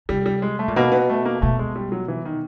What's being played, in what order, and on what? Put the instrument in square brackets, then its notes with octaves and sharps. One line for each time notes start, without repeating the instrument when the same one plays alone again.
[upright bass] C3 [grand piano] G3
[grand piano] G3
G#3
A3
[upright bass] A#2
[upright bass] B2 [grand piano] A#3
[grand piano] B3
A3
A#3
[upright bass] B2 [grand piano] A3
[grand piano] G#3
G3
F#3
E3
D#3